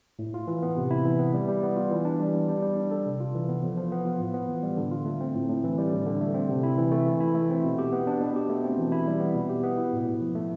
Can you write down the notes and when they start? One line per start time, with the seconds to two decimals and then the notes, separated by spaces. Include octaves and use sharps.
0.19 A2
0.34 F4
0.47 E3
0.63 B3
0.77 C3
0.91 E4
1.05 E3
1.19 B3
1.34 G3
1.49 G3
1.63 B3
1.76 F4
1.91 E3
2.05 D4
2.19 G3
2.35 B3
2.48 G3
2.63 G3
2.76 D4
2.91 A4
3.06 C3
3.20 F4
3.34 E3
3.49 B3
3.63 F3
3.77 F3
3.92 B3
4.05 F4
4.20 A2
4.34 B3
4.49 E3
4.63 G3
4.77 D3
4.92 F4
5.05 A3
5.21 C4
5.34 A2
5.49 A2
5.64 E3
5.78 G3
5.92 D3
6.06 D3
6.21 A3
6.34 C4
6.49 C3
6.63 E4
6.78 E3
6.92 A3
7.06 E3
7.20 E4
7.35 A3
7.50 C4
7.64 B2
7.78 G4
7.92 B3
8.07 D4
8.20 B2
8.36 G4
8.49 A3
8.64 C4
8.78 E3
8.92 E4
9.07 G3
9.20 B3
9.35 B2
9.49 G4
9.63 B3
9.78 E4
9.93 A2
10.07 A2
10.21 F3
10.35 A3